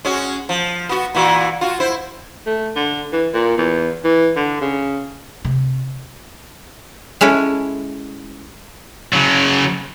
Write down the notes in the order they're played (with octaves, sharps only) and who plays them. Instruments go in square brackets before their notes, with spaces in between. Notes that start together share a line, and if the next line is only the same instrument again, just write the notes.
[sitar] G#3 C#4 F#4
F3
B3 F#4
A#2 E3 F#4
F4 F#4
E4 C5
[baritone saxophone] A3
D3
E3
A#2
E2
E3
D3
C#3
[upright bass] C3
[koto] G#3 C#4 E4 A4
[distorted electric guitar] C#3 F#3